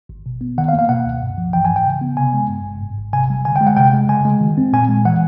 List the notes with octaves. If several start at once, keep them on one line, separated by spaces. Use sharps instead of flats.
G#1
B2
B3
D#3 F#5
F5
A#3
F5
B2 F#5
C#2
G2
F3
E3 G5
G#2 G#5
G5
C#3
B3
C3 G#5
G#3
G2
G1
G#2
G#1
C3 G#5
G3
D3 G#5
G5
G#3
F#5
C3 G5
G#3
C#3 G#5
G#3
D#3
C4
A#2 G#5
G#3
E3 F#5